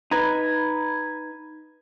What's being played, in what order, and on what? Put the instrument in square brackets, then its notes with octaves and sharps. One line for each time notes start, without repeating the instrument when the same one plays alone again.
[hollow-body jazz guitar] D#4 B4 [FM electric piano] A#5 B5 G#6